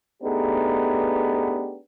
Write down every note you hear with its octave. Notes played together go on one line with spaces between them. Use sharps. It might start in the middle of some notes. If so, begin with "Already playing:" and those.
A3 B3 D4 D#4 G4 G#4